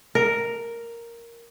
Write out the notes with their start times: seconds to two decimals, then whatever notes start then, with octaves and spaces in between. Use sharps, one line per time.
0.15 A#4